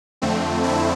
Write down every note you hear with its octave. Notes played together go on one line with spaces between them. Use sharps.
F2 D3 A3 C4
C4 E4